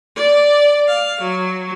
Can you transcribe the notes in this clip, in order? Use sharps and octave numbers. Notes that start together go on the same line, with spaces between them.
D5
F5
F#3